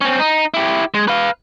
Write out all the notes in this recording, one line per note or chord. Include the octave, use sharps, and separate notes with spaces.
C4 C#4
D#4
E4 G4
G#3
B4 F5